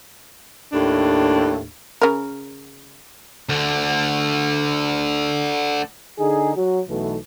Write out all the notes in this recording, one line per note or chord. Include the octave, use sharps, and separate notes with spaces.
D#2 A2 D4
C#3 A#4
D2 D3
D3 D#4 G#4
F#3
B1 B2 E3 A3